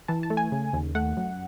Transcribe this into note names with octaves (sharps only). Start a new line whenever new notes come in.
E3 A5
A5
A3
G#5
C#3
D#2
A3 F#5
F#2